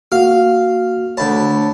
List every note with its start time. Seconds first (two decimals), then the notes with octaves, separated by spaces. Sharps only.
0.12 A#3 F#4 F5
1.17 D2 C#5 A5 B5